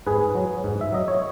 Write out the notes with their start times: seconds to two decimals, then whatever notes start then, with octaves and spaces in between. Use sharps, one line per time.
0.07 G#2 G#4 B4
0.35 F#3
0.64 G#2
0.81 E5
0.92 F#3 D#5
1.08 C#5